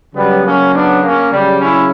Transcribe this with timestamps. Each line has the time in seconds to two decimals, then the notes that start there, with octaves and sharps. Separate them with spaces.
0.15 C#3 F#3 G3 B3
0.44 A#3 C#4
0.73 B3 D4
1.03 A#3 C#4
1.32 C#3 F#3 G3
1.61 C#4 E4